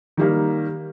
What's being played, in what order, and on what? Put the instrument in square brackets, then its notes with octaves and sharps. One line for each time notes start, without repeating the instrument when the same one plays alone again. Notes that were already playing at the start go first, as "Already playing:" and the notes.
[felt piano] D#3 G3 A#3